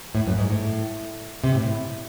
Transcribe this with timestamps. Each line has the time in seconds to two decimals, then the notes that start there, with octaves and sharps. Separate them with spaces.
0.15 A2
0.27 F#2
0.38 G#2
0.50 A2
1.44 C3
1.55 A2